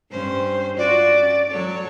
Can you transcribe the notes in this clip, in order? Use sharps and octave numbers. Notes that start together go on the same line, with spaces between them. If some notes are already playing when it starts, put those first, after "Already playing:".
G2 C#4 C5
F4 F#4 D5
C#4
F#3 A4 C#5